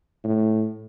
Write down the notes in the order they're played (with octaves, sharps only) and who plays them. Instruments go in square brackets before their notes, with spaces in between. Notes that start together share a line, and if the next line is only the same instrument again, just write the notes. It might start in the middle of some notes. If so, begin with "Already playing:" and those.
[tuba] A2